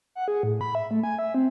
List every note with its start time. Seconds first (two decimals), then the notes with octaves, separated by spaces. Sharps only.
0.15 F#5
0.28 G#4
0.43 A2
0.61 B5
0.75 E5
0.91 A3
1.03 G#5
1.19 E5
1.35 C4